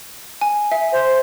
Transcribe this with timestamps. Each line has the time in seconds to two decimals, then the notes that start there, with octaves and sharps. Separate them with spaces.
0.41 G#5
0.72 E5
0.92 C5